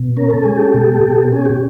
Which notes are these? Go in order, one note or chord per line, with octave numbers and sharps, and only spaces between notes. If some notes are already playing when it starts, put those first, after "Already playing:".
Already playing: B2
C#4 A#4
A4
G#3 G#4
G4 A4
B2
B2
C#4 G#4
G4